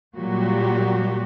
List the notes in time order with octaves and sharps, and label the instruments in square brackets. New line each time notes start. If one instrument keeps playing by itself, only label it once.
[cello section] A#2 F#3 G3 F#4 G4